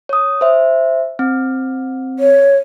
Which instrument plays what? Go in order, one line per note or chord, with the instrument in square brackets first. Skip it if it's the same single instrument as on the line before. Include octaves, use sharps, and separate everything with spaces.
[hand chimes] C#5 D#6
C5 E5
C4
[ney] C#5